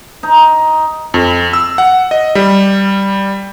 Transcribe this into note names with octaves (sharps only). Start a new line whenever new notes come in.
D#4
F2
E6
F#5
D#5
G3